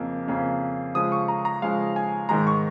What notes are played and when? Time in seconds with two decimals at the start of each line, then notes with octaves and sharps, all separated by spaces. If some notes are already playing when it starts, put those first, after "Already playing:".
Already playing: F2 C#3 A#3
0.27 F2 C#3 A#3
0.95 C#3 F3 G#3 D#6
1.12 C#6
1.28 A#5
1.45 A#5
1.62 C#3 F3 G#3 F5
1.96 G#5
2.29 G#2 D#3 G#3 A#5
2.47 C#6